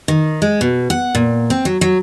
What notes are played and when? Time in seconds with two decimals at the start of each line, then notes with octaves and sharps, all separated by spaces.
0.08 D#3
0.42 G#3
0.61 B2
0.90 F#5
1.15 A#2
1.50 C4
1.65 F#3
1.81 F#3